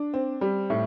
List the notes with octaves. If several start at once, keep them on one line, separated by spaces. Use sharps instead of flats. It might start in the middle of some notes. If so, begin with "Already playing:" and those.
Already playing: D4
C4
G3
A2